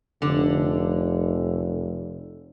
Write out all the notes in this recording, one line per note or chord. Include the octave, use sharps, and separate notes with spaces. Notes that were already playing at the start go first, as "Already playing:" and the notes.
F1 D3